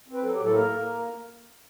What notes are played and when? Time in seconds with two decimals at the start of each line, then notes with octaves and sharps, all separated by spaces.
0.08 C4 B4
0.23 F#3 A4
0.34 G4
0.39 A2 A4
0.54 A#3 A#4
0.70 A#3